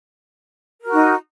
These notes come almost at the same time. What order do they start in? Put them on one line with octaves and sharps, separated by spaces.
A#4 F#4 D#4